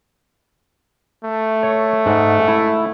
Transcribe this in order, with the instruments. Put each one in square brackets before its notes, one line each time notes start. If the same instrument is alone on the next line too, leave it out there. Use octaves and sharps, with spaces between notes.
[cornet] A3
[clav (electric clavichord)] C#5
G#2 F#5
E4